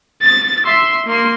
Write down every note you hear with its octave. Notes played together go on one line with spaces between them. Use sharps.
A6
E5 C6
A#3 C6